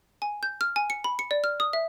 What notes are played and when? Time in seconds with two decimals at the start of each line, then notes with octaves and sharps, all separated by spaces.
0.22 G#5
0.43 G6
0.61 F6
0.76 G#5
0.90 C#7
1.04 B5
1.19 C#7
1.31 D5
1.44 F6
1.60 D#6
1.73 E5